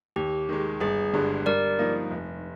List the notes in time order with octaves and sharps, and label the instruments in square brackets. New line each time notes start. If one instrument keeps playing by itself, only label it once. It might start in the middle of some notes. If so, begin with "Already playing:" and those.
[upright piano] D#2 [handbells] G4
[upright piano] D#3 G#3
[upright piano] G1 [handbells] G#4
[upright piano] G2 D3 G#3
[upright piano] G2 [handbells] A#4 D5
[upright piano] F3 A#3 D#4
F1